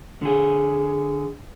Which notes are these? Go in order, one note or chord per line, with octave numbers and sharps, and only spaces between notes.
D3 G#4